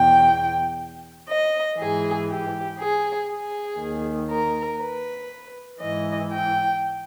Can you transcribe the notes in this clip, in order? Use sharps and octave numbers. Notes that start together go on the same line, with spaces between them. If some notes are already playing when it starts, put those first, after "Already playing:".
Already playing: E2 B2 G5
D#5
G#2 E3 G#4
G4
G#4
G#4
D#2 D#3
A#4
B4
G#2 E3 D#5
G5